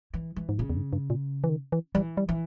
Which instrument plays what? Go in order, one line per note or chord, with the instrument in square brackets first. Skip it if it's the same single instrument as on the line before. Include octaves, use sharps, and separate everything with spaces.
[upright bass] E3
E3
[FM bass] G#2
[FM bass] A#2 [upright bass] C#3
[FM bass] E2
G2
G2
A#2
E3
D#3
E3
[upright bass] E3 [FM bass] G3
[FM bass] G3
[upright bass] E3